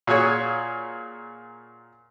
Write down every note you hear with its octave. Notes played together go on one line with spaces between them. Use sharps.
A#2 F#4 G#4 C#5